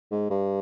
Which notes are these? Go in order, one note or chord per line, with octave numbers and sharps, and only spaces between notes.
G#2
G2